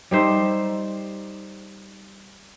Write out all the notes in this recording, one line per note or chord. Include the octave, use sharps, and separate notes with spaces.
G3 D#4 C5 E5